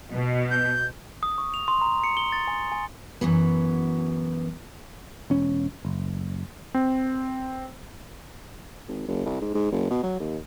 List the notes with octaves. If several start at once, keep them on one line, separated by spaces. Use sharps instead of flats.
B2
G6
D#6
C#6
F7
C6
A#5
C#7
G7
A6
G#5
G#5
F#2 B2 E3 F#3 B3
E1 C#4
F#1
C4
G#1
F#1
C2
G#2
G#2
F#1
B2
F#3
D#2